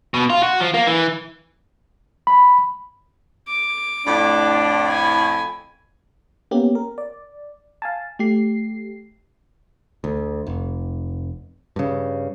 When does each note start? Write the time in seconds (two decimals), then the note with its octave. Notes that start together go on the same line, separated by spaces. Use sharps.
0.14 B2
0.30 F4
0.43 F#4
0.60 F3
0.74 A#3
0.87 E3
2.27 B5
3.49 D6
4.06 F2 A2 D4
4.89 G#5 B5
6.51 A#3 B3 C#4 G4
6.75 A#4
6.98 D5
7.82 F5 G#5 A5
8.19 A3 G4 C7
10.04 D2
10.47 F1
11.76 G2 C#3